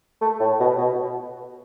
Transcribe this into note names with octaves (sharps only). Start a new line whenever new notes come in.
A3
A2
B2
B2